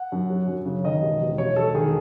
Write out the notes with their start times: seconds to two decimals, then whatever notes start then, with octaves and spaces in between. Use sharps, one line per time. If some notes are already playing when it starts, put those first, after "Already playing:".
Already playing: F#5
0.12 F#2
0.30 F#3
0.48 F#2
0.65 C#3
0.84 D#3 D#5
1.02 E1
1.21 E1
1.38 E1 C#5
1.56 E1 A4
1.74 D#3 G#4